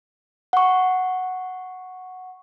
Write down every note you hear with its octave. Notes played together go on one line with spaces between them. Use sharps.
F#5 C#6